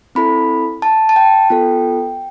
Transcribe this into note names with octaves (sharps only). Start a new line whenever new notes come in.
C4 E4 A4 B5
A5
A5
G5
B3 F4 A4